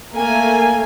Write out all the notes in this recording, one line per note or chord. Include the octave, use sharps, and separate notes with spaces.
A3 A#3 G#5